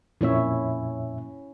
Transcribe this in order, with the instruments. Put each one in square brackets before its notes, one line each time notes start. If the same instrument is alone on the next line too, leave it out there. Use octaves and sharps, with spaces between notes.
[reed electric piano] F2 A#2 E5 [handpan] C#4 E4 C#5